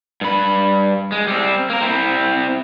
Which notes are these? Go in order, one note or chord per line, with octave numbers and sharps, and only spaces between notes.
G2 B5
G#3
G3 C4
A#3 A#4
C4 E4